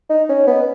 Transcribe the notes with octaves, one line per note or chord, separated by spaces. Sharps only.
D#4
C#4
B3